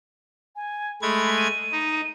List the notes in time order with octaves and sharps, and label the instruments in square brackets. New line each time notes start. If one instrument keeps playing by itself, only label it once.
[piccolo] G#5
[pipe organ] G#3 A3 G#6 [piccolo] B5
[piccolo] D#7
[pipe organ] D#4